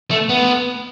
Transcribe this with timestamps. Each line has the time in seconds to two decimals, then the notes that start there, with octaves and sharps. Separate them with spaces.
0.11 A3
0.29 B3